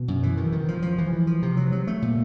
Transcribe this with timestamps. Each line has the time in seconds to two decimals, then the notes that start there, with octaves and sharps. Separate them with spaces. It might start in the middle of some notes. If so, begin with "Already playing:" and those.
Already playing: B2
0.08 F#2
0.23 E3
0.37 D#3
0.52 D#3
0.68 F3
0.82 F3
0.98 E3
1.13 E3
1.27 F3
1.42 C3
1.57 F#3
1.72 F#3
1.87 A3
2.02 A#2